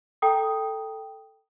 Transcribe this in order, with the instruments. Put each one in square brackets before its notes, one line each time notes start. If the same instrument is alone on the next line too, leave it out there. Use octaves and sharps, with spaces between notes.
[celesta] A4 G5 A#5 D#6